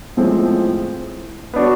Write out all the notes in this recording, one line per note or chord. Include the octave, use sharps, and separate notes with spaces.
A2 F3 G#3 C4
B3 D4 F#4